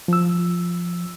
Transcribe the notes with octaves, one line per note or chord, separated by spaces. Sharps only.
F3 E6